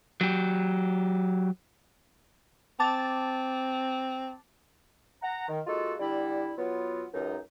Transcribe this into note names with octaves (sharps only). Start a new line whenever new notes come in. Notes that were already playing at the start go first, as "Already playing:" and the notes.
F#3 G4
C4 A5 D6 A6
F#5 A#5
D#3
G#3 A#3 D#4 F4 F#4 A4
D3 G3 E4
F#3 B3 F4
C#2 F#2 D#4